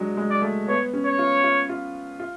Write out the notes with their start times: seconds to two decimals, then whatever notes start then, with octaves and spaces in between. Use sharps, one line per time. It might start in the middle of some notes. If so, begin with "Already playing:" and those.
Already playing: F#3 G#3 D4
0.17 G#3
0.30 D5
0.42 A3
0.68 B3 C#5
0.93 C#4
1.05 C#5
1.19 F4
1.44 F4
1.69 F4
2.19 F4